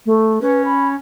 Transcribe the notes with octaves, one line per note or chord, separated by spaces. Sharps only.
A3
C#4 B4
B5